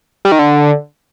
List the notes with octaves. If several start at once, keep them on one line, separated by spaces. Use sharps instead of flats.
G3
D#3
D3